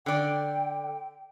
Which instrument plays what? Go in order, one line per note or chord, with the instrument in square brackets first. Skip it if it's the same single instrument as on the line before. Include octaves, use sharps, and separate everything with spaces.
[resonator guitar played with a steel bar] D3 D5 [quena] G5